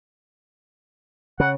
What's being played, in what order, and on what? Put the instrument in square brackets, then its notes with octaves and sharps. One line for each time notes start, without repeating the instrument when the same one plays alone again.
[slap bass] C#3 [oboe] F#5